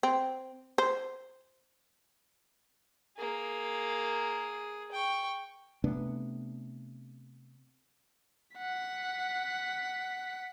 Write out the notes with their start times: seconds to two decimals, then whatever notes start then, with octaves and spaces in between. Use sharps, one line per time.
0.03 C4
0.78 C5
3.17 A#3 G#4
4.91 G5 C#6
5.84 C3 A3 B3 D4
8.57 F#5 B6